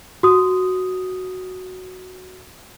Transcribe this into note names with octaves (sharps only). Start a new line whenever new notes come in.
F#4 D#6